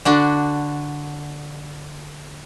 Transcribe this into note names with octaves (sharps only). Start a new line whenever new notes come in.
D3 D4 F#4